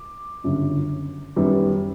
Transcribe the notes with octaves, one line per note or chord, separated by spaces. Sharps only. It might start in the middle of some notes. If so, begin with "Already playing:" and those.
Already playing: D6
G1 F#2 C#3
F#2 D#3 G3 B3